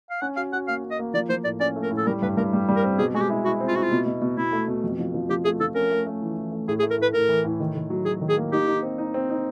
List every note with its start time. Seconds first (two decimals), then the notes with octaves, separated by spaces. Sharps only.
0.10 F5
0.21 C#4 F#5
0.37 F#4 F5
0.53 F#4 F#5
0.68 A#3 F5
0.84 C#4
0.91 D#5
0.99 A#3
1.14 F3 D5
1.29 F3 C5
1.44 A2 D5
1.60 C#4 D5
1.76 A3
1.83 A#4
1.91 A2
1.98 A4
2.07 G3 A#4
2.22 G2 B4
2.37 G2 A#4
2.53 G3
2.69 G3
2.76 A#4
2.83 C4
2.98 B2 G#4
3.14 G#3 F#4
3.21 G4
3.30 E4
3.45 E4 F#4
3.61 C4
3.68 F4
3.76 E4 F#4
3.83 F4
3.92 B2
4.06 B2
4.22 B2
4.37 B2 E4
4.52 A3
4.68 B2
4.84 F2
4.99 F3
5.14 F3
5.29 F3 G4
5.45 A3 G#4
5.61 F3 A4
5.75 C#4 A#4
5.91 A3
6.06 A3
6.22 E3
6.37 E3
6.52 A3
6.68 A2 G#4
6.79 G#4
6.82 A3
6.91 A#4
6.98 A2 B4
7.14 A2 A#4
7.29 E3
7.44 A2
7.60 D#3
7.75 D#3
7.90 F#3
8.05 F#3 G#4
8.21 D#3
8.29 G#4
8.37 A#3
8.52 D#4 G4
8.67 D#4
8.83 C4
8.98 D#4
9.14 C4
9.29 D#4